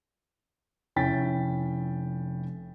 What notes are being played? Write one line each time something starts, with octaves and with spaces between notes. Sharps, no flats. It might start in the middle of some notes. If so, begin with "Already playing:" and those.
F1 C#4 E4 G5 A6 B6